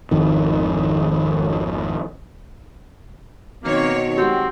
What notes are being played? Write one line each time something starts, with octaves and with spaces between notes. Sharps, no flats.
G#1 F2 D#3
B2 D#3 A#3 C4 C#5
G#3 C4 F#4 G4